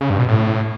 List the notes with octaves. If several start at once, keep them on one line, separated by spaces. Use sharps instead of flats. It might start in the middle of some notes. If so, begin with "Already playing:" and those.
C#3
G2
B2
A2